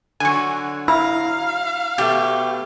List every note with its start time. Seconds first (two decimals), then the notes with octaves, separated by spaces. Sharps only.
0.20 D3 F#3 G#5 C#6
0.88 E4 F5 A#5
1.98 B2 A3 G4